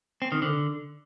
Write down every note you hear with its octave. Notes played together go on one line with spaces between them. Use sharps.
C4
D#3
D3